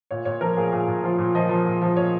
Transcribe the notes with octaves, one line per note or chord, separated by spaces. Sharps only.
A#2 C#5
A#2 C#5
F3 A#4
A#2 G#4
A#2 G#4
A#2
F3 F4
A#2
F3 D#5
F3
A#2
F3
A#2 C#5